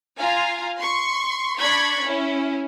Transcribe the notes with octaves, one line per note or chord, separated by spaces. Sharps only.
F4 F5 G#5 A#5
C6 C#6
D4 D5 B5 C#6 G#6 B6
C#4 E4